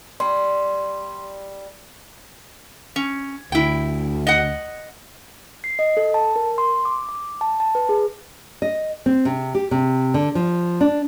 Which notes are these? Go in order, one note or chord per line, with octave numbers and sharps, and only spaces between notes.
G3 D5 C6
C#4
D2 E4 G5
D#5 F#5
C7
D#5
A4
A5
A#4
C6
D6
D6
A5
A5
B4
G#4
D#5
C4
C3
G4
C3
D3
F3
D4